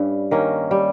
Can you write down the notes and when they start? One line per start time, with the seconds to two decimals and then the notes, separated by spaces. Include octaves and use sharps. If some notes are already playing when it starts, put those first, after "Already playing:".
Already playing: G2 G3 C#4 E4
0.31 D#3 A#3 C#4
0.71 G3